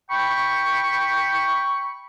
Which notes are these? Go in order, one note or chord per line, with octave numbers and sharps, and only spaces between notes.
G5 B5 C#6